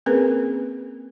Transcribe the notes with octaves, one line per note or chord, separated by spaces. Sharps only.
A#3 C4 C#4 G#4 A#4 B4